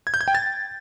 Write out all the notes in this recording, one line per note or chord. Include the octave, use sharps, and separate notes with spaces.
G#6
G6
G#6
G5
A6